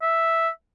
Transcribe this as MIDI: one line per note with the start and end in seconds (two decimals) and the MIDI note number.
0.02 0.49 76